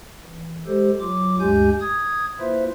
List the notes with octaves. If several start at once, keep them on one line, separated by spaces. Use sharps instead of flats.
E3
G#3 G4 A4 C5
F#3 F4 D6
D2 G2 G#3 G4 G#5 G6
D#6 G#6
A#3 E4 F4 B4 C5 E5